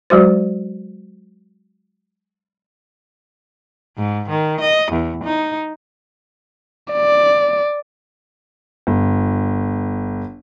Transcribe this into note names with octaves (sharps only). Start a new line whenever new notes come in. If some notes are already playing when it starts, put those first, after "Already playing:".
F#3 G#3 F#4 C5
G#2
D#3
D#5
E2
D#4
D5
G1